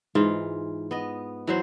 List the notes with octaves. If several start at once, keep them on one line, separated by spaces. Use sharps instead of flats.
G#2 E3 F4
B3 D#5
E3 F#3 C5